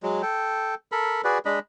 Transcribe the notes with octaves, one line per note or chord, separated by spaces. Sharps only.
F#3 G#3
A4 G5
A4 A#4 B5
F#4 G#4 B4 D5
G#3 D4 D#5 B5